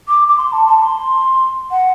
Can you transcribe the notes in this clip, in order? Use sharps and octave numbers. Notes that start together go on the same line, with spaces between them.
D6
D6
C6
A5
A5
C6
F#5